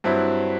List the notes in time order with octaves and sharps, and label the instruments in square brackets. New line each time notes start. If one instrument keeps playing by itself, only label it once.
[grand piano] G2 F#3 C4 E4